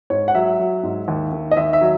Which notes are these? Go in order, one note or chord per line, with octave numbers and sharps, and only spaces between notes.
G#2 C#5
F#5
F#3 E5
F#3
G#2
D#2
D#3
D#5
D#2 E5
E5
F#3